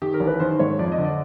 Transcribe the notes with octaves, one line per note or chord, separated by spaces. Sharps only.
D#3 G4
A#4
A1
B4
D#3 C5
G#2 C#5
F2 D5
D#5
D3
D5